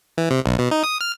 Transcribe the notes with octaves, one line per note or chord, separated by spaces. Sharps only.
E3
C3
B1
B2
D#4
D#6
F6